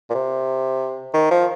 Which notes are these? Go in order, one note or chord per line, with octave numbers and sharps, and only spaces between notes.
A#2
C3
D#3
F3